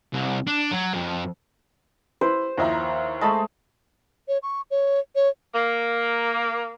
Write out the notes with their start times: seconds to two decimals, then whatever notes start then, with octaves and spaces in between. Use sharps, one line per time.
0.13 C2
0.47 D4
0.72 F#3
0.94 F2
2.21 E4 B4 C5
2.58 D#2 F3 E4 D#5 A#5
3.21 G#3 A3 D#5 A5 B5
4.28 C#5
4.43 C#6
4.71 C#5
5.15 C#5
5.55 A#3